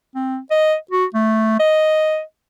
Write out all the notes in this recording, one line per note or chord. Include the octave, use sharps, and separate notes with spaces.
C4
D#5
F#4
A3
D#5